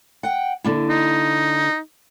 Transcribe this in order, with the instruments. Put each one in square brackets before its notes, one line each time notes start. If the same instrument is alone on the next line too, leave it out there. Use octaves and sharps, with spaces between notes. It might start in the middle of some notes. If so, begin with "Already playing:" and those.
[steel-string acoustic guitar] F#5 G5
D3 A#3 E4
[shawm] D#4